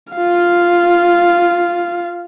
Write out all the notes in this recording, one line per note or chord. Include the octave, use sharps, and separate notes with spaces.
F4 F5